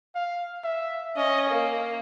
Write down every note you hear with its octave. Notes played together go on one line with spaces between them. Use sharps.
F5
E5
C#4 D#5
A#3